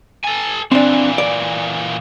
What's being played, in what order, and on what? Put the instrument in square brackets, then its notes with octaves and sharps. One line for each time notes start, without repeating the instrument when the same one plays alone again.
[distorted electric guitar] A4 G#5
[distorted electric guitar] A#2 E3 [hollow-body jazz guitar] C4 D4
[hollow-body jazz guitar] D5